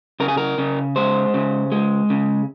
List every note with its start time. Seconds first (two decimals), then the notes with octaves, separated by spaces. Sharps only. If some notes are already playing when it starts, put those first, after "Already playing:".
0.20 C#3 A#4
0.28 G#4
0.37 A#4
0.58 C#3
0.96 G#3 C5
1.34 C#3
1.72 G#3
2.10 C#3